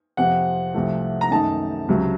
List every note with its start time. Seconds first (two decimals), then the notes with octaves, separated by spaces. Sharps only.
0.17 F2 C3 F3 F#5
0.74 C2 C3 F3 A3
1.21 A#5
1.31 F#2 D#3 A3 D#4 A5
1.88 C#2 C3 F#3